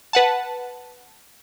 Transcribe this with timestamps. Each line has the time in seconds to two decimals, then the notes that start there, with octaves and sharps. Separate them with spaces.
0.13 B4 F#5 A5